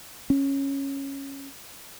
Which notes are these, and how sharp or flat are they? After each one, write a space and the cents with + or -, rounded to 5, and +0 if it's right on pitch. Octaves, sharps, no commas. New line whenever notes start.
C#4 -10